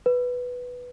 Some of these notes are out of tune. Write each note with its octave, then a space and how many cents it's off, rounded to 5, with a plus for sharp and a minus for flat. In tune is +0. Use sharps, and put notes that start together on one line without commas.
B4 +0